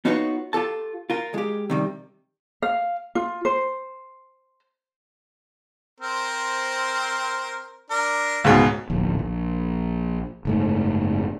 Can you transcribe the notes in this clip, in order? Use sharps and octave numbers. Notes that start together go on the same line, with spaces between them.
B3 D#4 F4 F#4 B4 C#5
F4 G4 A4 A5
F4 A#4
G#3 G4
C3 D#3 G3
F5
F4
C5
C4 A#4 C5
D4 A#4
C#2 G#2 B2
D1 A#1
A#1
F#1 G#2 A3